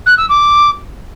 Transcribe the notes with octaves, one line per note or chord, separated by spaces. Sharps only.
F#6
E6
D6